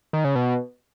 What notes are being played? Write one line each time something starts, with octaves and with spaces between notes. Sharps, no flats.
D#3
C#3
B2